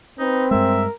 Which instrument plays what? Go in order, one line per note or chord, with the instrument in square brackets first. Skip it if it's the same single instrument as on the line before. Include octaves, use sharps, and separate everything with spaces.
[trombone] C4 [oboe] D#4 [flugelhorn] B4
[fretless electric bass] G2 G#3 [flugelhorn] A#4 [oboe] E5